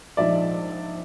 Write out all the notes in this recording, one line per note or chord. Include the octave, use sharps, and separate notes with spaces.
A#1 G#2 F3 G#3 D5 E5